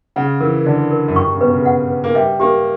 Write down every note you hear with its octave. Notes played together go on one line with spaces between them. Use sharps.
C#3 F#5
E3 A#4
D3 D5
A#4
F#2
G2 C#6
C#3
B2 B4
C#3
F#5
B4
A#3
G3 E5
A#3 G4